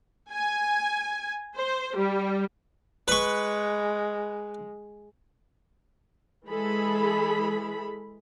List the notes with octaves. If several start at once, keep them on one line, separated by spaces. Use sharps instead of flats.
G#5
C5
G3
G#3 B4 C#6
E3 G#3 G#4 A4 B5